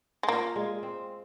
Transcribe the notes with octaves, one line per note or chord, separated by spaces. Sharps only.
G#3
A#3 F4
G#3
C4